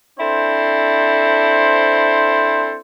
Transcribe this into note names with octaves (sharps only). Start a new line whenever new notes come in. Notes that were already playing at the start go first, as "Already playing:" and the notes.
C4 D4 E4 A4 C5